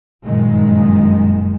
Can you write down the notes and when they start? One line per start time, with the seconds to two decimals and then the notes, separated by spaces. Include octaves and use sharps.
0.24 F#1 G2 A#2 D#3 G#3